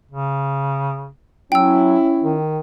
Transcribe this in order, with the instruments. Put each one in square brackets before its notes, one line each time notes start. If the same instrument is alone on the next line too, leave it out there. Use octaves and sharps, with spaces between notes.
[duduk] C#3
[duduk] F#3 [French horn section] C#4 E4 [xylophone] G5 E6
[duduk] D#3